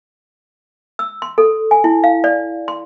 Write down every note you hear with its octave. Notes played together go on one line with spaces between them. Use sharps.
E6
C6
A4
G#5
E4
F5
D5
C6